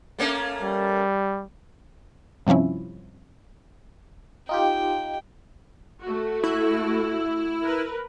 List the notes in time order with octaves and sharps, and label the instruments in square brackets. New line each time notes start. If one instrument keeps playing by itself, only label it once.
[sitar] A3 A#3 C#4
[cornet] G3
[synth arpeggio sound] G2 C3 F3 C#4 E4
[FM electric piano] D#4 F4 G4 [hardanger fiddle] G5
[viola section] A3 F#4
[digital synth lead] E4
[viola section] A#4 B4